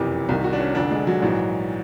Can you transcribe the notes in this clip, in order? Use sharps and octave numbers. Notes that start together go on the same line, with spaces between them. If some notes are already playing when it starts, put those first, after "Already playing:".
Already playing: F#1 F2 C3 E3 G4
C2 C3 D#3
F#4
D4
C#4
F1 F2 D3 D4
G#3
F#3
A#1 G#2 E3 F#3